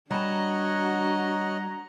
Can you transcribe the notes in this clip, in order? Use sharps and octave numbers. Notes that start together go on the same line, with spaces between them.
G3 D4 F#4 C#5 D#5 F#5 A5 A#5